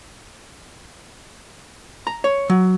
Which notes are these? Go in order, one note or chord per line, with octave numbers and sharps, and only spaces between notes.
A#5
C#5
F#3